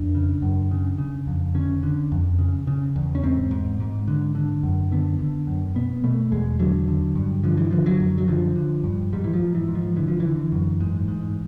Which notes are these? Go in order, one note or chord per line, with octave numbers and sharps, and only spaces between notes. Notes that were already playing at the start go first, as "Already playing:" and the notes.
Already playing: F2 D4
C#3
F#2
C#3
C#3
F2
D3 C#4
D3
F2
C#3
C#3
E2
C#4
G#2 C4
G#2
G#2
D3
D3
F#2
D3 B3
D3
F#2
B2 B3
B2 A3
E2 G#3
D3 F#3
D3
G2
D3 F3
E3
D3 F3
F#3
F#2
F#3
D3 F3
D3
G2
G#2 G3
E3
F3
G#2
E3
G#2
F3
D3 E3
F3
E3
D3
F#2
G#2
G#2